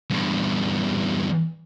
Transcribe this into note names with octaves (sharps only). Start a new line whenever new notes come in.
E2 G2